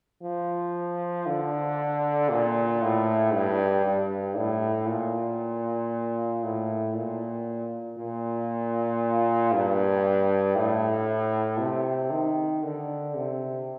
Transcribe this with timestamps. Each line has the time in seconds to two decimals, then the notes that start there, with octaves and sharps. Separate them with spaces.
0.23 F3
1.26 D3
2.29 A#2
2.82 A2
3.33 G2
3.85 G2
4.36 A2
4.88 A#2
6.44 A2
6.95 A#2
7.98 A#2
9.53 G2
10.55 A2
11.60 C3
12.11 D#3
12.63 D3
13.15 C3